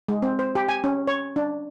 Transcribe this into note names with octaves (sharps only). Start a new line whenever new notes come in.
G#3
C4
C5
G4
G#5
C#4
C#5
D4